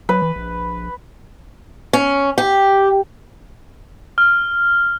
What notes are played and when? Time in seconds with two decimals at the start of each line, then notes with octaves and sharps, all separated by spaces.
0.09 F#3 B4
0.22 E3
0.36 A#1
1.93 C#4
2.38 G4
4.18 F6